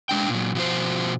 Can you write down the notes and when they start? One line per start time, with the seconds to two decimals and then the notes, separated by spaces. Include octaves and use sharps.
0.09 G#3 D4 G5
0.30 A#2 F#3
0.55 B2 F3 F#4 C5